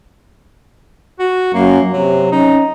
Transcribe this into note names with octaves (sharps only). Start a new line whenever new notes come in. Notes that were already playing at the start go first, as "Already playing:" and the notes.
F#4
F#2 A#3
C3 F#3
C#4 D#4